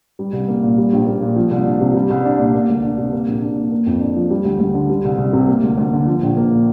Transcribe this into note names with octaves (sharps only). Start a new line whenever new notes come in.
G3
C2
A#3
A#2
G3
A#1
A#3
A#2
F3
C2
D4
C3
G3
C2
D4
A#2
A#3
D2
D4
C3
A#3
A#1
D4
A#2
A#3
F2
D4
F3
G3
D2
D2
D3
G3
C2
C2
C3
A#3
D2
D2
D3
F3
A#1
A#3
A#2